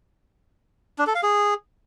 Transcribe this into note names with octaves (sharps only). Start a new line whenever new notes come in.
D4
A4
F5
G#4